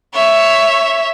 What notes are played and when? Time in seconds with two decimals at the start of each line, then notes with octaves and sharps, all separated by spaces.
0.14 C#5 E5